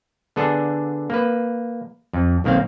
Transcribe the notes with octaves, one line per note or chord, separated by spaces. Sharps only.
D3 B3 D4 G#4 A4
A#3 B4
F2
B1 D#3 A#3 C4 F5